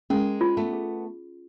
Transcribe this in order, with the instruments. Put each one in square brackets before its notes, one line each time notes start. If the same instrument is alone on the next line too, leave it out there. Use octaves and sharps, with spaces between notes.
[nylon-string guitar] G#3 A#3 [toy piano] C#4
[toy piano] F4
[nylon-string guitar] A3 B3
[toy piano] G#4